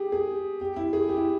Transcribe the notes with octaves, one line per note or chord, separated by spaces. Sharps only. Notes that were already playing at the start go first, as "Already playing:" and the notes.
Already playing: G4 G#4
G#4
G4
E4
G#4
G4
E4